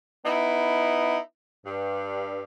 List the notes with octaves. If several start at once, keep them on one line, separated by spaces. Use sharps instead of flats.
B3 D#4 E4
G2